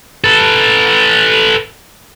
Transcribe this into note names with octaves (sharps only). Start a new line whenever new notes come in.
A4 B4